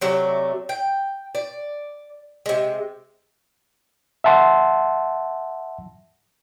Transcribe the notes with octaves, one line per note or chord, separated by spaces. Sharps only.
C3 F#3 A3 D5
G5
D5
C3 G#3
E5 F#5 A5 C6